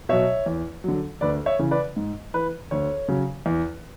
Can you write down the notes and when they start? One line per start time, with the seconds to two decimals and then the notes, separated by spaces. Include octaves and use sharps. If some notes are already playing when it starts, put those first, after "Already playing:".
0.09 B2 F#3 C#5 E5
0.46 E2
0.84 D3 F#3
1.21 D2 B4 D5
1.46 C#5 E5
1.59 C#3 E3
1.71 B4 D5
1.96 G#2
2.34 E3 B4
2.71 D2 C#5
3.08 C#3 F#3
3.46 E2